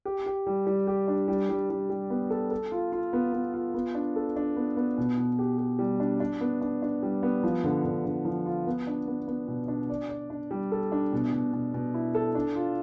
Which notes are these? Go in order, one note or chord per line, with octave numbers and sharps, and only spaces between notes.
G4
G4
G3
G3
G4
D4
G3
G3
G3
G3
B3
A4
A4
F4
F4
B3
B3
F4
B3
D4
A4
D4
B3
B3
B2
B2
G4
G4
G3
D4
D4
B3
D4
D4
G3
B3
F3
D3
D3
D3
F3
F4
B3
D4
B3
B3
B2
D4
D5
D5
D4
G3
A4
D4
B2
B2
B2
B2
E4
A4
D4
F4